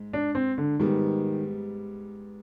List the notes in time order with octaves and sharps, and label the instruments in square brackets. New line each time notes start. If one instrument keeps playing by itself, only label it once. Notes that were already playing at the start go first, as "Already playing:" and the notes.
Already playing: [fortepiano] G#2
[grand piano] D4
C4
D3
[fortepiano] G#2 G3 B3 [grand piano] D#3